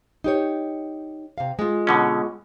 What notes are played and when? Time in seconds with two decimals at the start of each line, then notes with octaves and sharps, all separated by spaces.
0.24 D#4 G4 C#5
1.38 C3 F5
1.59 G#3 F4
1.87 B2 D3 C#4